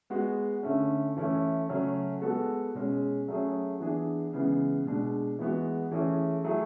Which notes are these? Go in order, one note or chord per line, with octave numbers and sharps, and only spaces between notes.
G#3 B3 F#4
D3 A3 C#4
E3 A3 C#4 E4
C#3 F#3 A3 C#4
G#3 B3 F#4 A4
B2 G#3 C#4
F#3 A3 C#4 G#4
E3 B3 D4 G#4
C#3 E3 G#3 B3
B2 G#3 D4
E3 G#3 B3 F#4
E3 A3 C#4 G#4
F#3 A3 E4 G#4